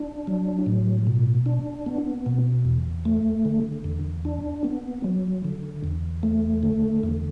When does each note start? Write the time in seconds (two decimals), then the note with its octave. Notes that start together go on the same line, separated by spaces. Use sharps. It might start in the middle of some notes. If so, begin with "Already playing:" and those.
Already playing: D4
0.27 F#3
0.66 A2
1.07 B2
1.46 D4
1.86 B3
2.26 B2
2.65 E2
3.05 A3
3.45 D3
3.84 E2
4.25 D4
4.64 B3
5.04 F#3
5.45 D3
5.84 E2
6.23 A3
6.63 D3
7.03 E2